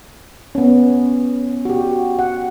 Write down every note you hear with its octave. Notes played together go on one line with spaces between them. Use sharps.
B3 C#4
F#4 G4
F#5